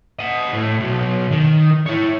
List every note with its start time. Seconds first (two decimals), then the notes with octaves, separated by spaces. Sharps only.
0.19 D#5 F#5
0.53 A2
0.80 B2 F#3
1.31 D#3
1.86 E4 C#5